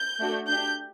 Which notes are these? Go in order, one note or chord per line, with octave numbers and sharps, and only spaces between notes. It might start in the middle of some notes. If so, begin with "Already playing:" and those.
Already playing: G6
A3 D4 F#4 A4
D4 G4 G6